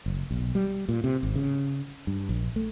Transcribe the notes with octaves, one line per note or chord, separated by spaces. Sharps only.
F#1
B1
G3
A#2
C3
G#1
C#3
G2
A#1
A3